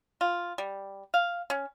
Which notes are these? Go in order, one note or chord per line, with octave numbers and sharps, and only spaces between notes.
F4
G3
F5
C#4